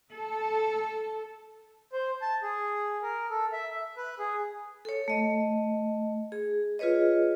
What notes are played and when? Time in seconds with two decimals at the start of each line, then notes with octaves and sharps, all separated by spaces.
0.12 A4
1.93 C5
2.22 A5
2.42 G#4
3.02 A#4
3.30 A4
3.53 E5
3.71 E5
3.97 B4
4.19 G#4
4.85 A4 C#5
5.08 A3 D#5
6.32 G#4
6.79 F4 G#4 B4 C#5 D#5